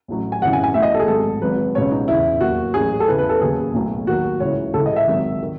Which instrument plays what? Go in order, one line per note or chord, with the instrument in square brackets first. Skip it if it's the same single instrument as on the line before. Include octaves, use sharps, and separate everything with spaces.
[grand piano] A1 A2 F#3
G#5
G#1 F#2 C#3 E3 F#5
G#5
G#5
B1 A2 E3 E5
D#5
A4
G#4
G#1 G#2 F#3 A4
G#1 G#2 F#3 B4
C#2 B2 F#3 C#5
D#4
E2 C#3 E3 E4
D#2 D#3 F#3 F#4
A1 A2 F#3 G#4
A4
E2 C#3 E3 B4
B4
A4
D#2 C#3 F#3 G#4
B1 A2 F#3
D#2 D#3 F#3 F#4
C#2 C#3 E3 C#5
C#2 A4
C#3 E3
D#5
E5
G#1 G#2 D#3 F#3
D#3